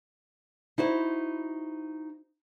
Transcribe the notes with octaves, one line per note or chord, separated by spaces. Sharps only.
D#4 E4 F#4 C5